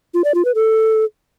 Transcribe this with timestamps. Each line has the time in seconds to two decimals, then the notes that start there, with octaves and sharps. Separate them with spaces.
0.14 F4
0.24 D5
0.35 F4
0.45 B4
0.55 A4